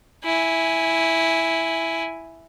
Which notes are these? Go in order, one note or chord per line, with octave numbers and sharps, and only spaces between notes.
E4 G#5